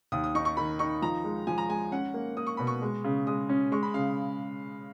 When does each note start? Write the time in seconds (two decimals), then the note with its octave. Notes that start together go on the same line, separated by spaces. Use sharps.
0.12 D#2 D#6
0.24 D#6
0.35 D#4 C#6
0.45 C#6
0.57 D#3 B5
0.79 D#4 C#6
1.02 F3 A#5
1.24 G#3
1.47 F3 G#5
1.58 A#5
1.69 G#3 G#5
1.92 C#4 F#5
2.14 A#3
2.37 A#3 D#6
2.47 C#6
2.57 B2 B5
2.67 C#6
2.82 G#3
3.04 C#3
3.27 G#3 D#6
3.49 C#4
3.72 G#3 C#6
3.83 B5
3.94 C#3 F5